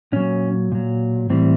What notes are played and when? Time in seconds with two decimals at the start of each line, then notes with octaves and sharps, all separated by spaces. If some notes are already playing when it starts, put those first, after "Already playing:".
0.12 A#2 F#3 C#4
0.72 A#2 F#3
1.30 A2 E3 G3 C4